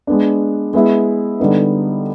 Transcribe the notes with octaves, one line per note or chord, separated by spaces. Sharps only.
G#3 B3 D4
G#3 B3 E4 G#4
D3 G3 B3 D#4